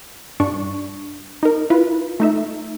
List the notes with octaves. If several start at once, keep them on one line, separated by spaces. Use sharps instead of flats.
G2 D4 C#6
D#4 A#4
E4 F4 B4
A3 D#4 E5